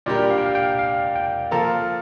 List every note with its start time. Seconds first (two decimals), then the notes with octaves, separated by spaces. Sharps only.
0.06 A#2 G3 D4 G4 A#4 D5
0.30 F5
0.38 G5
0.46 F5
0.55 G5
0.79 F5
1.16 G5
1.51 F3 A#3 F4 A4 A#5